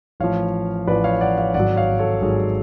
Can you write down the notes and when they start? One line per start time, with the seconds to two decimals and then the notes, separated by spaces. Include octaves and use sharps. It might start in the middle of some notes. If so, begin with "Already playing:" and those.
0.20 A1 A2 F3 C#5 F5
0.87 A1 A2 F3 B4 D5
1.04 C#5 F5
1.21 D5 F#5
1.37 C#5 F5
1.54 G#1 G#2 F#3 D5 F#5
1.76 C#5 F5
1.99 A4 C#5
2.22 G#1 G#2 F#3 G#4
2.39 G#4